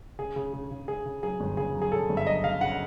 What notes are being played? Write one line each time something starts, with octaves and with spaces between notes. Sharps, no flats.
C#3 G#4
C#3
C#3
C#3
C#3 G#4
C#3
F#3 G#4
G1
C#3 G#4
F#3
G#4
C#3 A4
G1
E5
F#3 D#5
C#3 F5
C#3 F#5